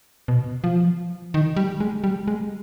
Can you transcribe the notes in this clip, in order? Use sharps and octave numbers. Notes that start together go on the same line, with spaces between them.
B2
F3
D#3
G3
G#3
G3
G#3